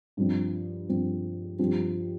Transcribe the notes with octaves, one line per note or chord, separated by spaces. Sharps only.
G2 F3 C4
G2 F3 C4
G2 F3 C4 G4